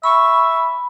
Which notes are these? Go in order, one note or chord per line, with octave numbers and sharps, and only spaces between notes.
E5 B5 C#6